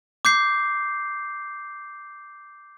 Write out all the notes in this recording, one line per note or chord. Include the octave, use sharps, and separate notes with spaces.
D6 G6 C7